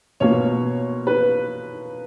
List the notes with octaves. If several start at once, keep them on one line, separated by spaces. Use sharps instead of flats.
B2 A#3 F4 C#5
B4